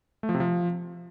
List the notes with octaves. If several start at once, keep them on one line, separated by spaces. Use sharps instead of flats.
A3
F3
C3
F3